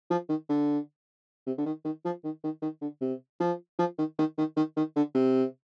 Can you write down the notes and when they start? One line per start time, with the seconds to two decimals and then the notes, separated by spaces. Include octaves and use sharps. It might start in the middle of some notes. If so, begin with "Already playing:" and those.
0.11 F3
0.29 D#3
0.49 D3
1.46 C3
1.58 D3
1.66 D#3
1.85 D#3
2.05 F3
2.24 D#3
2.44 D#3
2.62 D#3
2.81 D3
3.01 C3
3.40 F3
3.79 F3
3.98 D#3
4.18 D#3
4.38 D#3
4.56 D#3
4.77 D#3
4.96 D3
5.15 C3